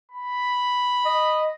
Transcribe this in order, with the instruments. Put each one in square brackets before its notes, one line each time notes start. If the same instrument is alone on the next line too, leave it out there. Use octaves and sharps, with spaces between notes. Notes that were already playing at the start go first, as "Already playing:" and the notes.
[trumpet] B5
[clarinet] D#5